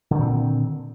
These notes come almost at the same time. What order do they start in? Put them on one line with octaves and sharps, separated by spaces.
D3 D#3 A#2 C4